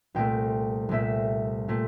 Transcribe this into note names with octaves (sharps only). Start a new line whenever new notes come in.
C2 A#2 A3 C4 G5
C2 A#2 A3 C4 E5
A#2 A3 C4